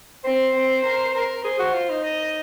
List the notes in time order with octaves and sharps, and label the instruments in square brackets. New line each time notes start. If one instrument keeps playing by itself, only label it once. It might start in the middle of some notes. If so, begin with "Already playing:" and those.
[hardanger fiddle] C4 [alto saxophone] C5
[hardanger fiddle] C4
A#4
A#4
[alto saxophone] G#4 [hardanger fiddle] C5
[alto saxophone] F#4
F4
D#4
[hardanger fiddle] D#5